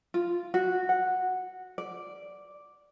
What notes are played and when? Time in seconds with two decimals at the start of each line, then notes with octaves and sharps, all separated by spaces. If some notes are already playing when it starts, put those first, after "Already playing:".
0.14 F4
0.54 F#4
0.89 F#5
1.78 D5